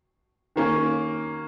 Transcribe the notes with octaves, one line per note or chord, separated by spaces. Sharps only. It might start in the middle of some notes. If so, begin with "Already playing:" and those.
D#3 A#3 C#4